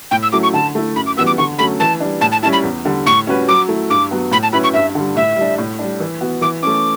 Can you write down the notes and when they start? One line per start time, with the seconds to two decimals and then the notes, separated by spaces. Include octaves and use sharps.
0.11 A2 G5
0.23 E6
0.32 F#3 A3 C#4 E4 D6
0.43 C#6
0.54 D3 A5
0.75 A3 E4
0.96 F#2 B5
1.07 D6
1.17 E3 G3 B3 F#4 E6
1.27 D6
1.38 D3 C#6
1.58 F#3 A3 C#4 B5
1.80 E3 A5
2.01 G3 D4
2.21 A2 A5
2.32 A5
2.43 G3 C#4 E4 A5
2.53 B5
2.64 E2
2.85 D3 G3
3.06 A2 C#6
3.27 G3 C#4 F#4 B4
3.48 F#3 D6
3.68 A3 E4
3.90 G2 D6
4.11 F#3 B3
4.32 A2 B5
4.43 A5
4.53 F#3 C#4 E4 B4 B5
4.64 C#6
4.74 G2 E5
4.95 D3 G3
5.16 A2 E5
5.36 G3 D4
5.58 A2
5.79 G3 D4
6.00 E3
6.21 B3 F#4
6.41 E3 D6
6.62 A3 C#4 D6